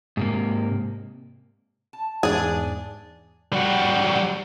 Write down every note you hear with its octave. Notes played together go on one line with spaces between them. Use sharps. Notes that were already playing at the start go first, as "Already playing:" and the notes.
G#2 C3 A#3
A5
E2 G#2 D4 G#4
G3 F#4